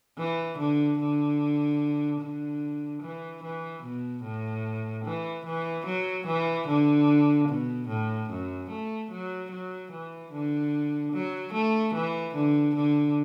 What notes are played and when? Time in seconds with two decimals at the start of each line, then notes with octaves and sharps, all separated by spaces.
0.18 E3
0.58 D3
1.00 D3
2.21 D3
3.02 E3
3.43 E3
3.83 B2
4.24 A2
5.05 E3
5.46 E3
5.86 F#3
6.27 E3
6.68 D3
7.48 B2
7.89 A2
8.30 F#2
8.70 A3
9.11 F#3
9.51 F#3
9.92 E3
10.32 D3
11.13 F#3
11.53 A3
11.94 E3
12.35 D3
12.76 D3